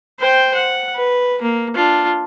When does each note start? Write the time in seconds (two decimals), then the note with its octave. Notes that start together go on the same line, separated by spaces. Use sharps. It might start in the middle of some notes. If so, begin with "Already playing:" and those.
0.20 C5 G5
0.55 F#5
0.96 B4
1.42 A#3
1.75 D4 F4